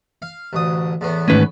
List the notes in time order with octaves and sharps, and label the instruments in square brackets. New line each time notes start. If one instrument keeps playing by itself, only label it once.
[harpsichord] F5
A1 D2 D#6
E2 A2 B3
[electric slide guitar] G#2 D#3 A3 [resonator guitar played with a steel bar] C#4 B4